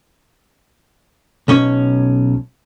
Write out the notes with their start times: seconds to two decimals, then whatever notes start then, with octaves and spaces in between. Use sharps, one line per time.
1.48 B1 C#4 C#5